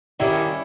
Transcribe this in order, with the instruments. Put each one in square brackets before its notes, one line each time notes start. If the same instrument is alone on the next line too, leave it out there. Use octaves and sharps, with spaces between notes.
[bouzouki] D#3 G3 A#3 C#4 [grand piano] E4